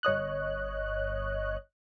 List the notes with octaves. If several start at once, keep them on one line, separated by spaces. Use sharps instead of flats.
G1 C#5 D#5 F#6